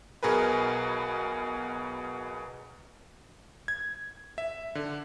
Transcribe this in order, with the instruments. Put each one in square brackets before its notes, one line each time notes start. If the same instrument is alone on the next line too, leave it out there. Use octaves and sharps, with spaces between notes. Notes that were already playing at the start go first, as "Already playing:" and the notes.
[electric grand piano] B1 B2 G#4 A#4 B4
G#6
E5
D3